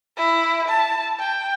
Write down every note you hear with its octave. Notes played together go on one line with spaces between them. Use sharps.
E4
A5
G5